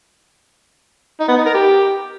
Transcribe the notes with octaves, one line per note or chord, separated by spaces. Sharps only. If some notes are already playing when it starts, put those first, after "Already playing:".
D#4
B3
D#4
A#4
G4